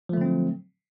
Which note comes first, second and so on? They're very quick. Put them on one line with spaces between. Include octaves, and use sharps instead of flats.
F3 A3 D3 C4 F#3